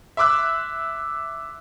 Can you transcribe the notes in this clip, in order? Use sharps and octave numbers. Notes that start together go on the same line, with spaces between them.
E5 C6 D6 E6 F#6